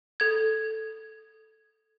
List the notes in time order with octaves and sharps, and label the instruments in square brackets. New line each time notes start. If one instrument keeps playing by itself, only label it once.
[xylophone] A4 G#6